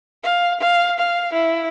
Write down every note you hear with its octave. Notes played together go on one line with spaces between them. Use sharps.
F5
F5
F5
E4